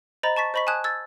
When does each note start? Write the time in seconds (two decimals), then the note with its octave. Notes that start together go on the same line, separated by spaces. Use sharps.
0.23 C5 D#5 A#5 B5 A6
0.37 A5 C#6 A6 B6
0.54 C5 D#5 B5 C#6 B6
0.67 G#5 A5 D#6 F#6 G#6
0.84 E6 G#6 A6